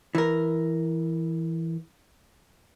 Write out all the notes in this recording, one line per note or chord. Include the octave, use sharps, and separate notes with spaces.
E3 A#4